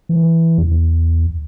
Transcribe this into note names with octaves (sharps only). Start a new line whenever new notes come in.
E3
E2